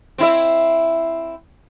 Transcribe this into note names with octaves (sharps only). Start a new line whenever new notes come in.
C4 E4 E5